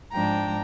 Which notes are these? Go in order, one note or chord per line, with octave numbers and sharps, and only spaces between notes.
G#2 F3 G#3 D4 G5 A#5